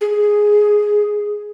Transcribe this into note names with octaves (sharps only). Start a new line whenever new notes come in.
G#4